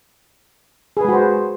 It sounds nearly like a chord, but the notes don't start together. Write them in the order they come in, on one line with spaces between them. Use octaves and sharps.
G#4 B4 G#3 F#4 C5